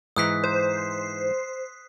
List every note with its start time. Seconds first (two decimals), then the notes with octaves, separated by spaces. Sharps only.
0.16 G#2 E3 D#4 D#6 F#6 B6
0.44 C5